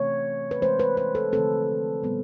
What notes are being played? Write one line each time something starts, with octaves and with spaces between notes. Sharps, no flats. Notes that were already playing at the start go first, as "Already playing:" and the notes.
Already playing: C3 E3 A3 C4 C#5
B4
E3 G#3 C4 C5
B4
B4
A4
D3 F3 A3 C4 A4
A#2 G3 B3